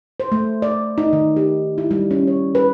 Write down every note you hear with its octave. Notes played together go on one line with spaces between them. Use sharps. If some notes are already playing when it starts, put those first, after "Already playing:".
C5
A3
D5
D#4
D#3
G4
E4
G3
C#4
C#5
B4